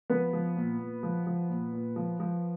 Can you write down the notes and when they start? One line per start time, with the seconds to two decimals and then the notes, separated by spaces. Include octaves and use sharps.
0.10 F3 B3 B4
0.33 F3
0.56 A#2
0.79 A#2
1.03 F3
1.27 F3
1.49 A#2
1.73 A#2
1.96 F3
2.20 F3